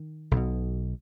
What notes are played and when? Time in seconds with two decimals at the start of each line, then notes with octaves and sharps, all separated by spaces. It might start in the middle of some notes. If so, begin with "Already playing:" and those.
Already playing: D#3
0.31 B1
0.37 B2